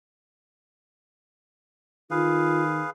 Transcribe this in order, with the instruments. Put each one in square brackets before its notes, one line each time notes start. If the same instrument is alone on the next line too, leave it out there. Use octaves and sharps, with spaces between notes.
[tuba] D#3 [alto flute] F4 [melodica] G#4 B4 F5